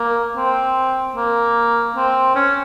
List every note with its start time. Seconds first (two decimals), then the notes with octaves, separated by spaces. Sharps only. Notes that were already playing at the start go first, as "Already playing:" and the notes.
Already playing: A#3
0.37 C4
1.15 A#3
1.96 C4
2.35 C#4